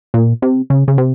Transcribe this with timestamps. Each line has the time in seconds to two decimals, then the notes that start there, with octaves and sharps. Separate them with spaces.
0.14 A#2
0.42 C3
0.70 C#3
0.88 C#3
0.98 C3